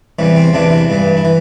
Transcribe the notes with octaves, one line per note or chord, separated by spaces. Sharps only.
E2 C3 E3 G3
C4
E2 C3 E3 D4
E4
G2 E3
E4
E3